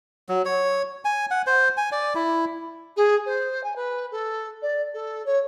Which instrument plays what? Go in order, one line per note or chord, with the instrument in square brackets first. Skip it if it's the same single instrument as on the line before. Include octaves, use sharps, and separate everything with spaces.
[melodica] F#3
C#5
G#5
F#5
C5
G#5
D5
E4
[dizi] G#4
C5
G#5
B4
A4
D5
A4
C#5